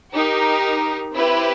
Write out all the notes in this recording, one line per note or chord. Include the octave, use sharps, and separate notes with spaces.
D#4 G4 A#4
C4 E4 G4 B4